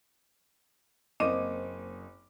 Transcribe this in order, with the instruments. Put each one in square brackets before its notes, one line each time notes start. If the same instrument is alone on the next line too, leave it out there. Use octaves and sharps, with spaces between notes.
[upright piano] F#1 A#3 C4 D#5 D6 D#7